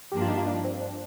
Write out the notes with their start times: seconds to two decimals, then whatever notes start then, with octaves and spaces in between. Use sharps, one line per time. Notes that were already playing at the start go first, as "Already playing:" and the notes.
0.12 G2 F3 A#3 D4 G4
0.21 F4
0.29 D#4
0.37 F4
0.47 D4
0.64 C4
0.81 D4